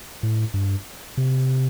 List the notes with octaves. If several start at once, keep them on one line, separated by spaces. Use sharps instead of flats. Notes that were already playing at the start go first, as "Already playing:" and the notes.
A2
G2
C3